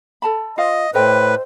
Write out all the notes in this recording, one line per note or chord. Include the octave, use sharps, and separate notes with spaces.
A4 A5 B5
F4 C5 D#5 F5
A2 A4 B4 C5 D#5 G5